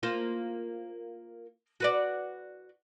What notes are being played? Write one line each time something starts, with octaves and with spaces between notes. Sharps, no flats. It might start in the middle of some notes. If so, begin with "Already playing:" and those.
A#3 F4 C5
F#4 B4 D5